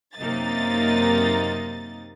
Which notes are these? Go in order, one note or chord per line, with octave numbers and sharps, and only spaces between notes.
F#2 C3 A#3 D#4 D#5 A6